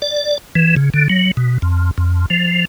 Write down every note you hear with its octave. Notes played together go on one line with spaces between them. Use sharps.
D5
E3
C#3
D3
F#3
B2
F2
F2
F3